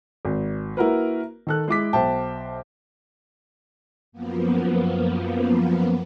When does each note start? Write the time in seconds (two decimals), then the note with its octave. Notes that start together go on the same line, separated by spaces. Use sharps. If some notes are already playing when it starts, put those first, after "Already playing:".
0.25 G#1
0.77 A#3 E4 F#4 A#4 B4
1.47 D#3 A4 F#6
1.68 G#3 E4 D6 B6
1.93 B1 C5 E5 G5 A5
4.12 F#2 F3 A#3 B3